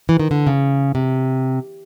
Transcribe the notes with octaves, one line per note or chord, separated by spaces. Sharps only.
E3
D#3
D3
C#3
C3